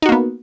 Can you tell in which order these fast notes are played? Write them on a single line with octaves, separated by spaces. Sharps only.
D#4 F#4 A#3 B3